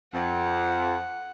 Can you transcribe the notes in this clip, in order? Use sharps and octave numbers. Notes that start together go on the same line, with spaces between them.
F2 F#5